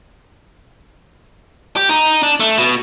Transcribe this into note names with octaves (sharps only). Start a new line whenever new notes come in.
G4
D#4
D4
A3
B2